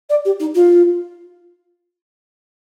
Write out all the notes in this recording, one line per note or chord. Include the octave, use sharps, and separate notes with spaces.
D5
G4
D#4
F4